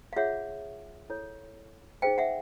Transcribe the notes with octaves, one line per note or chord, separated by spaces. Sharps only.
F5
F4 G#4 C#5 E5 F#5
E4 A4 C#5
D#4 G#4 C5 F5 G5
E5 F#5